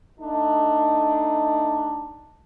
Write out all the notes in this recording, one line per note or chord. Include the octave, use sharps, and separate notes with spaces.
A3 D4 D#4